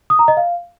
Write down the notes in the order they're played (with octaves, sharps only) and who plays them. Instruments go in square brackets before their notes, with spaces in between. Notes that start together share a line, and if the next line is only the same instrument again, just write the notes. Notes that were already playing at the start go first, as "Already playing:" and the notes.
[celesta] D#6
A#5
D#5
F5